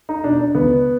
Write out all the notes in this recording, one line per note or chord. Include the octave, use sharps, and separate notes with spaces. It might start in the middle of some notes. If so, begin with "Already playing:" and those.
D#4
B2 D4
D4
C#2 B3